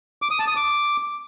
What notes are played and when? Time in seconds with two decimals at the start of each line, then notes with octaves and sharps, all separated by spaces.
0.22 D6
0.31 D#6
0.39 A5
0.48 D#6
0.56 D6